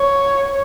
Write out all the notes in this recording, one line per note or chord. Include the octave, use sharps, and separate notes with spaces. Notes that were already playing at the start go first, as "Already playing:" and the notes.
Already playing: C#5